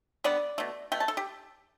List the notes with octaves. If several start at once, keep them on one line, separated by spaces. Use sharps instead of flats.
D3 G3 B3 D5
B2 A3
B2 A3 G5
A5
A4
G4